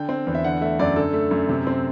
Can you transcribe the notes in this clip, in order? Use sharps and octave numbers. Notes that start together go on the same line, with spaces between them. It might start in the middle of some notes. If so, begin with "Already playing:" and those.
Already playing: D3 G5
C4
E2
E5
D3 F#5
A3 E5
F#2 D5
D3 A4
A3
F#2
C3
C4